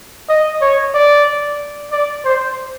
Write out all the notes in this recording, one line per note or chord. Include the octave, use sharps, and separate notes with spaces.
D#5
C#5
D5
D5
C5